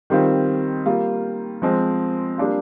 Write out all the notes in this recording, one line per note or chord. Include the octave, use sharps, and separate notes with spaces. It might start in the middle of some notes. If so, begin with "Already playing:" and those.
D#3 G3 C4 F4
G3 A#3 F4
F3 G#3 C4
G3 A#3 D4 F4